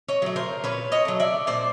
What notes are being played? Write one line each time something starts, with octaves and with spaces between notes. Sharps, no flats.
C#5 D#5
F#3 A3
A#4 C5
A#2 B4 C#5
C#5 D#5
F#3 A3
D5 E5
A#2 C5 D5